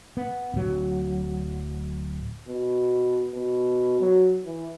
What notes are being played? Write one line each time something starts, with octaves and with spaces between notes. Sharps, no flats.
B3
D1 F#3
B2
B2
F#3
E3